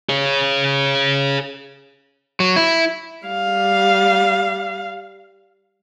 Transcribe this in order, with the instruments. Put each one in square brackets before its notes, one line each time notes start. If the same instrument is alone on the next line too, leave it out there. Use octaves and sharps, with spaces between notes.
[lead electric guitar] G#4 C#5
[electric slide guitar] F#3
E4
[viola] G3 F5